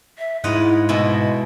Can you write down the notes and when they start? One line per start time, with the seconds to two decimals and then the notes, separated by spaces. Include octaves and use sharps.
0.18 E5
0.44 G#2 E4 F4 D#5 F#5
0.89 B2 G#3 E4 D#5